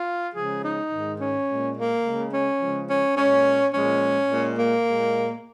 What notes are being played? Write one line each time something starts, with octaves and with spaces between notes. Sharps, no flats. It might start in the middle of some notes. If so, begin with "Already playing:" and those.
Already playing: F4
C#3 F3 G#3 G#4
D#4
G#2 D#3 G#3
C#4
A#2 G#3
A#3
C#3 G#3
C#4
C#3 F3 G#3
C#4
A#2 G#3 C#4
A#2 F3 G#3 C#4
A#2 G#3
A#3
A#2 G#3